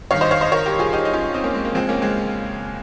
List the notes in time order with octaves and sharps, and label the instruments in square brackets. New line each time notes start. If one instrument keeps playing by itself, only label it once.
[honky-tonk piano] G#1 G2 D#3 C#5 F5
C5 D#5
C#5 F5
C5 D#5
A#4 C#5
G4 A#4
F4 G#4
D#4 G4
D#4
C#4 F4
C4 D#4
A#3 C#4
G#3 C4
A#3
C#2 C#3 F3 G#3 C4
A#3 C#4
G#3 C4